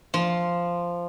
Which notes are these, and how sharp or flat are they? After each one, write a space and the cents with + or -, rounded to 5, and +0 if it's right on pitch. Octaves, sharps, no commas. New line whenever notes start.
F3 -5 C6 +0